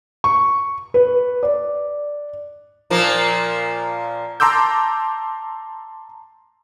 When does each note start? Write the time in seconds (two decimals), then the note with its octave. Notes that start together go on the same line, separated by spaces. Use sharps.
0.24 C#6
0.94 B4
1.43 D5
2.90 A#2 F3 A#3
4.40 A5 A#5 C6 D6 E6 G6